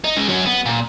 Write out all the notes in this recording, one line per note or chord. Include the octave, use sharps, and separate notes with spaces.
D#4
C#3 G#3
F#3 C#4
B3
A#2